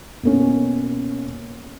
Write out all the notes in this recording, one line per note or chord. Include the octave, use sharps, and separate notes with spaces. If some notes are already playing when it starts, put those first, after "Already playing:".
B2 A#3 C#4